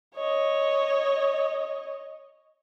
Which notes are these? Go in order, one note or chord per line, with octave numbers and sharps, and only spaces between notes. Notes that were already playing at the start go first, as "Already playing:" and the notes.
C#5 D#5